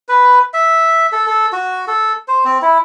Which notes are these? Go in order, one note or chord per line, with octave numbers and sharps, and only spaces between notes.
B4
E5
A4
A4
F#4
A4
C5
C4
E4